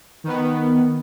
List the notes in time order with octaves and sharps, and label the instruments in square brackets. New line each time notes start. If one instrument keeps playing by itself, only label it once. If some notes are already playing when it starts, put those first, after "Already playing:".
[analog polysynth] D#3 B3